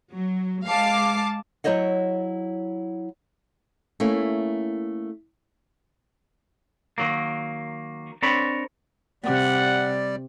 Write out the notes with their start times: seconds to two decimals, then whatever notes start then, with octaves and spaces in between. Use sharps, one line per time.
0.12 F#3
0.67 G#3 F5 A5 D6 C7
1.64 F#3 E4 C5 C#5 D#5 F#5
4.00 A3 A#3 C#4 E4
6.98 D#3 F#3 A#3
8.22 C4 D4 A#4 C#5 B5
9.24 C3 G3 D5 F#5